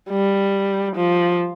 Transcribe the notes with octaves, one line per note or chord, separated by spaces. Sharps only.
G3
F3